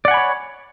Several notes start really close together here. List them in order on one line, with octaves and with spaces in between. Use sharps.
D5 F#5 G#5 B5 C#5